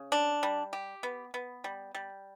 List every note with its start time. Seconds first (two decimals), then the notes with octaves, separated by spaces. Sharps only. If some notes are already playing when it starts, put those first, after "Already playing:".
Already playing: C#3
0.12 D4
0.43 G3
0.73 G4
1.03 B3
1.34 B3
1.64 G3
1.95 G3